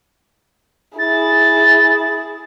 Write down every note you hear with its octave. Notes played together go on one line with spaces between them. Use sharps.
E4 G#4 A6